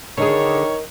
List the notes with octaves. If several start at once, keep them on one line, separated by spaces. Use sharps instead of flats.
D3 D#3 G#4 C#5